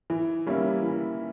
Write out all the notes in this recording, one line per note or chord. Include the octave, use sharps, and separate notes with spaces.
E3
G3 A#3 C#4 E4
E3